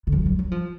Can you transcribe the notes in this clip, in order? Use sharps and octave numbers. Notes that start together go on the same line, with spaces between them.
D3
F3
F#3
F#3
F3